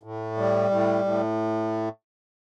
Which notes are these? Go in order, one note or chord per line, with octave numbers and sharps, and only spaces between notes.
A2
G3
A2
A2